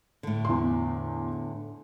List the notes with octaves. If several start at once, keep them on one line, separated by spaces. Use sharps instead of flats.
A2 D3
E2 C6